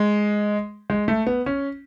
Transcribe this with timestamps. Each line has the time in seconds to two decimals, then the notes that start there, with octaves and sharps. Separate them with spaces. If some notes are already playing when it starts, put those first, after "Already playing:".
Already playing: G#3
0.90 G#3
1.08 A3
1.27 B3
1.46 C#4